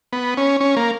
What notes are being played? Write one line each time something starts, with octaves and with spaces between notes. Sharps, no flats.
B3
C#4
C#4
A#3